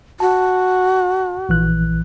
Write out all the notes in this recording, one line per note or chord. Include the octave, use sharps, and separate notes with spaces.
F#4 A5
A#1 E3 F#6